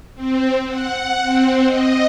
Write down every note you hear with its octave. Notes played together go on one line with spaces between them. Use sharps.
C4
F#5
C4
D#5